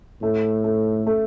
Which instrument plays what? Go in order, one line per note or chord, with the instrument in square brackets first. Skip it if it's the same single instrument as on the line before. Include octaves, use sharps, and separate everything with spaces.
[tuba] A2 [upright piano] A3
[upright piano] A3
A3